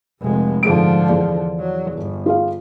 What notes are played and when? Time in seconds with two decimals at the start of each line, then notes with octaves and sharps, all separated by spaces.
0.22 F1 G#3
0.63 G#2 D3 F3 G#4 D7
1.09 E2 D5
1.59 F#3
1.92 G1
2.26 F4 G#4 F5